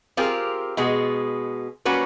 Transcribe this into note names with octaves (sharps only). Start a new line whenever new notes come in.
C4 F4 G4 G#4 A#4
B2 G#3 B3 G#4
F#3 G3 A#3 C#4 F#4 B4